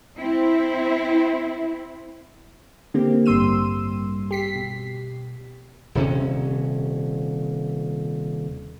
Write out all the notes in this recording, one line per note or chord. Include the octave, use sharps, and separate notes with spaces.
C4 E4
D3 A#3 C4 G4
A1 G2 G3 C6 E6 D#7
G4 B6 C7
B2
D#1 C3 C#4